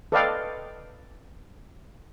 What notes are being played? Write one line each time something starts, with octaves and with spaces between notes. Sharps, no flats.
A4 B4 D5 D#5 F5 G5